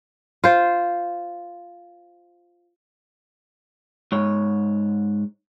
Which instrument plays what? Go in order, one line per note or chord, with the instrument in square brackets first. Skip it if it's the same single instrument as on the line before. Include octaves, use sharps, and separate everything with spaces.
[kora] F4 C5
[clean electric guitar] G#2 C#5